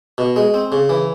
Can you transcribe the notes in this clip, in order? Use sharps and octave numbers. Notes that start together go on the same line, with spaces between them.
B2
G#3
C4
C#3
E3